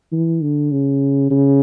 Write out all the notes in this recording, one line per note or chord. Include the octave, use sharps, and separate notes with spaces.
E3
D3
C#3
C#3